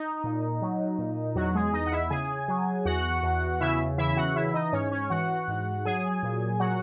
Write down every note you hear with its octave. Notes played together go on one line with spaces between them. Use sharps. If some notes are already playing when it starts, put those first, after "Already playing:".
Already playing: D#4
A#2
F#3
A#2
E2 F#3 F#4
G#3 G#4
E2 D#4 D#5
F#5
E4 E5
C#3 G#4 G#5
F#3
E2 F#4 F#5
E2
C#3 E4 E5
E3 E4 E5
F#4 F#5
E3 E4 E5
D#4 D#5
G#2 C#4 C#5
C#4 C#5
E3 F#4 F#5
G#2
F#3 G#4 G#5
A#2
F#3 F#4 F#5